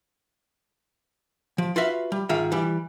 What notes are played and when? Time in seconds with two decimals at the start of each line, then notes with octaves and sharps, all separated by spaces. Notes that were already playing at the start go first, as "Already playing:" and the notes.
1.58 F3
1.76 F4 F#4 B4 E5 F5
2.12 G3
2.29 G#2 D#3 F4 G#4 E5
2.52 E3 G3